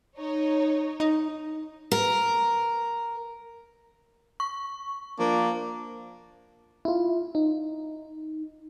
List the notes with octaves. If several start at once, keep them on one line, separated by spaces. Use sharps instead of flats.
D#4 C#5
D#4
A#4
C#6
F3 A#3 D4
E4 F4
D#4